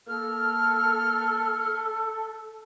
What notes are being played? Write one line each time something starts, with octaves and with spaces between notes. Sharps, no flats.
A#3 A4 F6